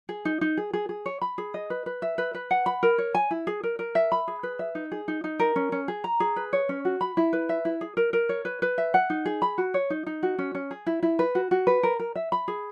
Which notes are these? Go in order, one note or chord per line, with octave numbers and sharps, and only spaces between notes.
G#4
D#4
D#4
G#4
G#4
G#4
C#5
B5
G#4
D#5
B4
B4
E5
B4
B4
F#5
B5
A#4
C#5
G#5
E4
G#4
A#4
A#4
E5
B5
G#4
B4
E5
D#4
G#4
D#4
D#4
A#4
C#4
C#4
G#4
A#5
G#4
B4
C#5
C#4
F#4
B5
E4
B4
E5
E4
G#4
A#4
A#4
C#5
B4
B4
E5
F#5
D#4
G#4
B5
F#4
C#5
D#4
D#4
F#4
C#4
C#4
G#4
E4
E4
B4
F#4
F#4
B4
A#4
A#4
E5
B5
G#4